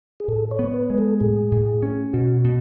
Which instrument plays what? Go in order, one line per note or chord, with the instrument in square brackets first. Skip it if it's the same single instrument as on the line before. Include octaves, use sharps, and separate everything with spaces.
[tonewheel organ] G#4
[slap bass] A2 [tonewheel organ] A4
[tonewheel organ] C#5
[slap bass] B3
[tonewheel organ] B4
[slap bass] G#3
[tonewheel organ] A4
[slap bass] A2 [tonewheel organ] G#4
[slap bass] A2
C#4
[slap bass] B2 [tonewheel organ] F#4
[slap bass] B2